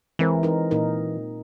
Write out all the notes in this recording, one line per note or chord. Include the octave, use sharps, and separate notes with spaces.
E3 G#3 C4 A#4
D#4 A#4
A#2 D#4 A#4